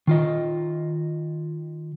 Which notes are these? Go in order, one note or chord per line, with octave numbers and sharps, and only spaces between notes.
D#3 F4 D#5